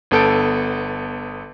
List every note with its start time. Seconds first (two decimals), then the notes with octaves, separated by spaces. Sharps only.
0.11 G1 B3 A4 G6 D7